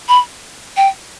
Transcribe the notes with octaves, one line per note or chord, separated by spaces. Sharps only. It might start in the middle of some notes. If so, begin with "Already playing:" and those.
B5
G5